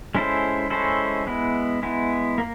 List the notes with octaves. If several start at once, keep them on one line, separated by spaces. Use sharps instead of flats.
G#3 C#4 E4 A4 C5
G#3 C#4 E4 A4 C5
G#3 B3 E4
G#3 B3 E4
A#3